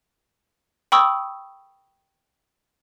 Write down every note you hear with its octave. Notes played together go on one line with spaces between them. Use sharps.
G5 B5 C#6 D#6 E6